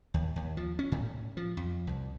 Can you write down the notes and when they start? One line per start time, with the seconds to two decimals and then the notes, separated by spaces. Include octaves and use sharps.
0.14 D#2
0.36 D#2
0.57 F3
0.79 C#4
0.92 A2
1.37 F3
1.57 F2
1.87 C2